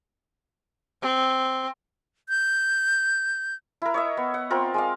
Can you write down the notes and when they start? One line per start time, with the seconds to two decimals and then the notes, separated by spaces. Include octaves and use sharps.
1.02 C4
2.29 G6
3.82 E4 A#4
3.94 C#5 D#5 E5
4.17 B3
4.34 F#5
4.50 C4 F4 A#4
4.74 G#3 D5 F5